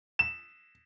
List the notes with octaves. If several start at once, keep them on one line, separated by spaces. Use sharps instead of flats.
E7